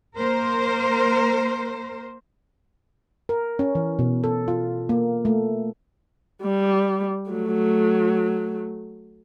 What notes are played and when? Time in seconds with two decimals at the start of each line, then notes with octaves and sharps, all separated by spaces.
0.17 A#3 A#4 C5
3.29 A#4
3.59 C#4
3.75 E3
3.99 B2
4.24 A4
4.48 F4
4.89 A#3
5.25 A3
6.42 G3
7.31 F#3 A3